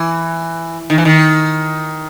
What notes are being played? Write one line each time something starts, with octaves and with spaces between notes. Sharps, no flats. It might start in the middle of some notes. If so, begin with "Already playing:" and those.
Already playing: E3
D#3
E3
D#3